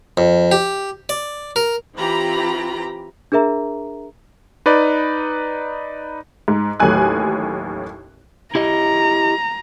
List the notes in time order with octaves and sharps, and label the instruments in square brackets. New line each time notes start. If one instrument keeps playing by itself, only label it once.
[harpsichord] F2
G4
D5
A#4
[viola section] E3 C4 F4 G4 A#5 B5
[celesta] D4 G#4 A#4 E5 A#5
[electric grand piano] D#4 B4 D5
[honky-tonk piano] G#2
A1 D#2 A2 F#3 G#5 F#6
[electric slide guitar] E4 G4 D#5 [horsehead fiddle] A#5